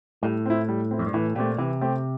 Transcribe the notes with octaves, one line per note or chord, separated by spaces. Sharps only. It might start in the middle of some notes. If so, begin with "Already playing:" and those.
A2 G3
C4 E4
G3
C4 E4
F2
G2
A2 E3
A#2 A3 C4 G4
C3 E3
A3 C4 G4